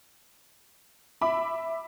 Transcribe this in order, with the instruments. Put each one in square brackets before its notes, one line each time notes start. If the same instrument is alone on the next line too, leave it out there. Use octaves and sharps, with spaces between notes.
[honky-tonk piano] E5 B5 D6